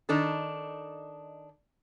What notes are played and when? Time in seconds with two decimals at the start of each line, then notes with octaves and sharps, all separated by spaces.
0.09 D#3 D4 D#4 A4